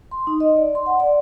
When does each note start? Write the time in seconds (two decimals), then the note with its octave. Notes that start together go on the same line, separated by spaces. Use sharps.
0.11 C6
0.27 D#4
0.40 D#5
0.57 D5
0.75 C6
0.86 F#5
1.00 D5